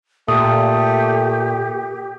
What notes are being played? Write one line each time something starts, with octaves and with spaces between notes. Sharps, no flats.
A#2 A3 G4 D#6